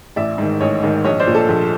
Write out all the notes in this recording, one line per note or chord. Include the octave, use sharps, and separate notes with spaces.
A1 D5 E5
G#2 D#3
A1 C#5 D#5
G#2 D#3
A#1 C#5 D#5
C5 D5
A#2
A4
A#1